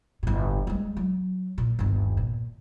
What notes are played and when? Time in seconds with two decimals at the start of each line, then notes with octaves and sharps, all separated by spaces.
0.23 G1 A2
0.67 G3 G#3
0.97 F#3
1.58 A#2
1.79 G1 D#2
2.17 A#2